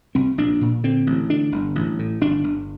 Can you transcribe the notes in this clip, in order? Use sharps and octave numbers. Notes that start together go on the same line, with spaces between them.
C2 C4
A#1 D4
A#2
D3 C4
A1
D3 D4
G1
A1
A2
G1 D4
G1